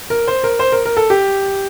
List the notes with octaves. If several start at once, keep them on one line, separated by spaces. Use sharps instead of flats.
A#4
C5
A#4
C5
A#4
A#4
A4
G4